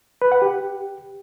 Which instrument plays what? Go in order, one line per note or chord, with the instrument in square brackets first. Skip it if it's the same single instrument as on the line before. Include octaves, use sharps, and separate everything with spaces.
[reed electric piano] B4
F#5
G4